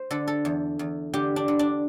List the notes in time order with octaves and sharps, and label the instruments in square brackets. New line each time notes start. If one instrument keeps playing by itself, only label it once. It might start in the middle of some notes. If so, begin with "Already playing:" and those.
Already playing: [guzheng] C5
D3 A4
A4
E2
E2
D3 G4
D4
D3
D4